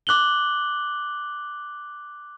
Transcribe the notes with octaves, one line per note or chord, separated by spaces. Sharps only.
D6 F#6 F#7 G7